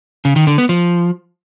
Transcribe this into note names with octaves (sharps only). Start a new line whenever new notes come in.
C#3
D#3
D3
B3
F3